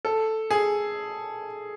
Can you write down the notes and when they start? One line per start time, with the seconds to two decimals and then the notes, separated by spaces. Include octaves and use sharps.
0.05 A4
0.51 G#4